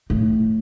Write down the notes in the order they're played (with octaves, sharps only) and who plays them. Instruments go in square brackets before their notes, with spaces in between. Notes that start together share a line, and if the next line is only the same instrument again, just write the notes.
[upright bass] A2